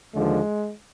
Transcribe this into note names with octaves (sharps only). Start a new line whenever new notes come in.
D#2 D3 F3 G#3